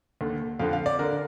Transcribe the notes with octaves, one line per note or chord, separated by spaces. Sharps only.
D#2 D3
F2 D3 F5
F5
D5
D3 A#4